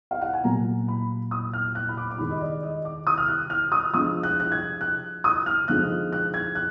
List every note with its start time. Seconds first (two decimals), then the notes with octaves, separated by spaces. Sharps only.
0.11 F5
0.21 F#5
0.33 G#5
0.44 A#2 F#3 A#3 A#5
0.88 B5
1.31 D#6
1.53 F6
1.75 F#6
1.89 B5
1.97 D6
2.10 D6
2.18 D#3 G#3 D#4 B5
2.31 D#5
2.41 D5
2.63 D#5
2.85 D6
3.07 D#6
3.18 F6
3.28 F#6
3.50 F6
3.72 D#6
3.94 F3 G#3 D4 D#6
4.23 F#6
4.40 F#6
4.52 G#6
4.81 F#6
5.24 D#6
5.46 F6
5.68 D3 F3 G#3 D#4 F#6
6.12 F#6
6.34 G#6
6.55 F#6